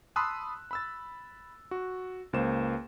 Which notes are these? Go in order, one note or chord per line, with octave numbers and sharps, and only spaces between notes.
A5 B5 C6 D#6 E6 F#6
B5 E6 A6
F#4
C#2 A#3 C5 E7